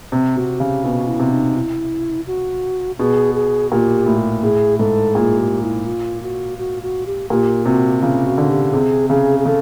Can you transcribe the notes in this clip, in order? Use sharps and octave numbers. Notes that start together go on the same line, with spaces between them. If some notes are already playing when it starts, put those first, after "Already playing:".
C3
C3 F#4
C#3 G4
B2 F#4
E4
C3
D#4
E4
F#4
B2 G#4
G#4
A#2 G4
A2
A2 G#4
G#2 A4
A#2 G#4
G4
E4
F4
F#4
F#4
F#4
G4
A#2 G4
C3 F#4
C#3 F4
F#4
D3
G4
C3 G#4
C#3 G#4
G#4
C#3 A4